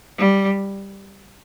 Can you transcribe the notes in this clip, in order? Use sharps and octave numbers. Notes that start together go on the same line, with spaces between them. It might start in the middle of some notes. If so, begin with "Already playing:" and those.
G3